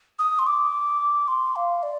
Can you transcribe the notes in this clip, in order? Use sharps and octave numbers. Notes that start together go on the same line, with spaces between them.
D#6
C6
D6
C6
F5
D5